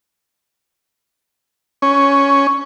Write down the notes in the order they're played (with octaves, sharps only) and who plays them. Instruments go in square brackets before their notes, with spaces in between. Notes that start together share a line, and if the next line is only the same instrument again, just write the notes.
[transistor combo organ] C#4